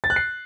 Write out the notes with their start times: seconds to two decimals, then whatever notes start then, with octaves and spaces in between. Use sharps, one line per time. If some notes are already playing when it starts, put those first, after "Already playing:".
0.04 A6
0.10 F#6
0.16 C7